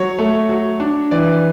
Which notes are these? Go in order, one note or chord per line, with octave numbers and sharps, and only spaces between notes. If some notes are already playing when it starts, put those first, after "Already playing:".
Already playing: F#3 C#5
A3
F#3
D4
E3 D5